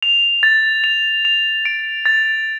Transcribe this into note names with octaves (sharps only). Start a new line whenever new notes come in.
F7
A6
F7
F7
D7
A6